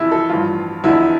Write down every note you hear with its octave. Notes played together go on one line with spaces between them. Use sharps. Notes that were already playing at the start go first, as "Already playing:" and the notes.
Already playing: E2 C3 F3 E4
A4
A1 G2 F3 F4
F1 E2 D3 F3 E4